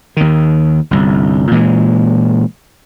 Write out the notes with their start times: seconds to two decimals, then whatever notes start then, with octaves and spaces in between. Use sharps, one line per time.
0.17 D#2 D#3
0.91 G1 C2
1.51 A#2 E3 G#3